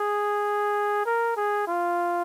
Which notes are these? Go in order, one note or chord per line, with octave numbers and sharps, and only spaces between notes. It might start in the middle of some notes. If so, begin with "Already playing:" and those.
Already playing: G#4
A#4
G#4
F4